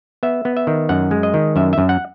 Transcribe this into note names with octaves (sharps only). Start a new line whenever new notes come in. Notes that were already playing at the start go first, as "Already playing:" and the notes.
B3 E5
B3
E5
D#3
F#2 F#5
G#3
D#5
D#3
F#2 E5
F#2 E5
F#5